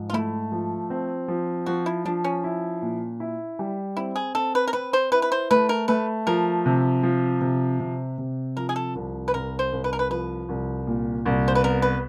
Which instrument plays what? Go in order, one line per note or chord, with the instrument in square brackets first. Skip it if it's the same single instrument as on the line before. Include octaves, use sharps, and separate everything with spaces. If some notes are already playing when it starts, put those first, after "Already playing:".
Already playing: [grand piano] G#2 F3
[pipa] F4
[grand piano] A3 [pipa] E4
[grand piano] F3
C4
F3
[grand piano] F3 [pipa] F#4
[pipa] E4
[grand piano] F3 [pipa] D4
[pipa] C#4
[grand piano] E4
A#2
E4
G3
[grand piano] C4 [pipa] E4
[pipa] G#4
[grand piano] C4 [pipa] A4
[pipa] B4
A#4
[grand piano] C4 [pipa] B4
[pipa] C5
[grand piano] E4 [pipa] B4
[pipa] B4
C5
[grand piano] A3 [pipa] B4
[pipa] A#4
[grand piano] A3 [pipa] B4
[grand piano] F3 [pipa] A#4
[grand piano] C3
F3
C3
C3
C3
[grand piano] F3 [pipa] A#4
[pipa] G#4
A4
[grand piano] C2
[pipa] B4
[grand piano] C2 [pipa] A#4
[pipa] C5
[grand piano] C2
[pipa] B4
A#4
B4
[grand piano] F3 [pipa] B4
[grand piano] C2
A#2
C2
[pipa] C5
B4
[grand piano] B3 [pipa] A#4
[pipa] B4